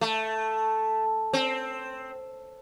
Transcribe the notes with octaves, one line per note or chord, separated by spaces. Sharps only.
A3
C4